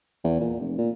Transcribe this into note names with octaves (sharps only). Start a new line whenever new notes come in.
E2
A#2
F1
A#2